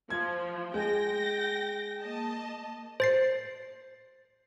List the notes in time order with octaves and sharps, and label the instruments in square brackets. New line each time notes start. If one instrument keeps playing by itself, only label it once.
[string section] F3 [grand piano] G#6
[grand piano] G#3 [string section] G5 A#6
[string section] A#3 D#5 A5
[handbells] C5 A6 C7